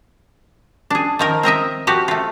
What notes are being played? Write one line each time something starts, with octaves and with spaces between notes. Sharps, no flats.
D4 G#4
D#3 F3 A#4
C4 A#4 D#5 E5
F3 F#4 G4
A3 F4